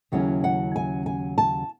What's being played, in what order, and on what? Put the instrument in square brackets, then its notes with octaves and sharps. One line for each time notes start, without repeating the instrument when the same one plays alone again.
[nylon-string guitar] D#2 C#3 F#3 C#4 E4 F#5
F#5
G#5
G#5
A5